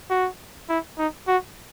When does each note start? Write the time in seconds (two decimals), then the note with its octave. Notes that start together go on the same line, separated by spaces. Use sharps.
0.10 F#4
0.69 E4
0.98 D#4
1.28 F#4